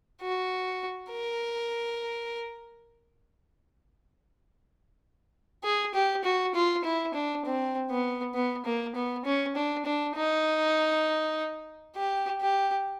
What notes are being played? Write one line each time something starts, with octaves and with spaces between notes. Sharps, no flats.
F#4
A#4
G#4
G4
F#4
F4
E4
D4
C4
B3
B3
A#3
B3
C#4
D4
D4
D#4
G4
G4